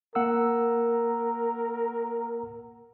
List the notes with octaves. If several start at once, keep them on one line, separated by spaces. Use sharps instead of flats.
A#3 A#4 F#5 E6